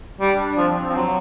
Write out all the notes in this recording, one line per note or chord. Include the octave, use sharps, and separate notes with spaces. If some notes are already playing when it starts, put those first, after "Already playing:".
G3 D4
F3 C4
F3
F#3